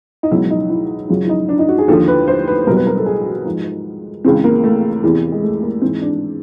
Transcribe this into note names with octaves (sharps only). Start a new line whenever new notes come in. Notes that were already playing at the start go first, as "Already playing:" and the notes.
D#4
C#2 B2 F#3 E4
D#4
E4
F#2 C#3 F#3 F4
E4
D#4
D4
D#4
F#4
G#4
D#2 D3 F3 A4
B4
C5
B4
C2 B2 F#3 A#4
B4
A#4
A4
G#4
F#4
G#2 F3
C#2 C#3 E3 C4
A#3
A3
E2 C3 E3
G#3
A3
A#3
G#2 E3 C4
D4